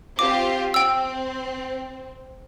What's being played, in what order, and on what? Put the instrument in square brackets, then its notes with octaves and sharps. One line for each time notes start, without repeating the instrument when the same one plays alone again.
[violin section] C4 F4 G4 [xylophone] D6
[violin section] C4 [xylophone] G5 E6